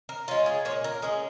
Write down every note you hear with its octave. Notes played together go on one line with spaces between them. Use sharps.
A#4
G#3 C#4 F4
G#4
A#2 C#5
A#4
G#3 C#4 G#4